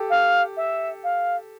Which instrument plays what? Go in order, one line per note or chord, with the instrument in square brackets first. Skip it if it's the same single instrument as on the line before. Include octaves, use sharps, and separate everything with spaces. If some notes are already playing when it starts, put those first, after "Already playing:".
Already playing: [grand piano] G4 A4
[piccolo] F5
E5
F5